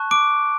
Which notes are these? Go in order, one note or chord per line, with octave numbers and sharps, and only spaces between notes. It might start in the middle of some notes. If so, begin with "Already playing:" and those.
Already playing: A5 C#6 F#6
D6 D7